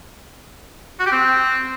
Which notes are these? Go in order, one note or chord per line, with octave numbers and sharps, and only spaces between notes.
F#4
G4
C4